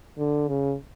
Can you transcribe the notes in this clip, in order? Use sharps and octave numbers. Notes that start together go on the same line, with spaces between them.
D3
C#3